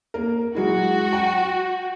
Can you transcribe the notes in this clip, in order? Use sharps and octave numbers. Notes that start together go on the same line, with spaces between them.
A#3 A#4
F#3 G#3 E4 F#4
G5